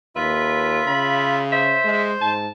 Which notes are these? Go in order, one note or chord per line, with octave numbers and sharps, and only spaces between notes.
D#2 F4 B4 E5
C#3 B5
C5 E5
G#3
G#2 A5